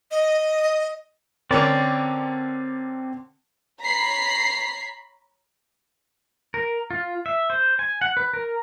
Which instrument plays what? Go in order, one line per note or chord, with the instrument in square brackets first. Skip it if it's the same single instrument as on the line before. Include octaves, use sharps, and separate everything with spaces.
[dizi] D#5
[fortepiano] D3 C#4 A#4 [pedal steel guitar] C4 D5
[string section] C#5 A#5 B5 B6 C7
[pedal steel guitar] A#4
F4
E5
C5
G#5
F#5
B4
A#4